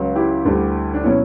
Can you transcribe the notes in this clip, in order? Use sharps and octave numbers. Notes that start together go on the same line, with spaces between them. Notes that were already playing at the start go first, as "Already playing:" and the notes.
Already playing: C#2 C#3 F#3
E4 G4
D2 D3 G3
D4
B2 F#3 C#4 E4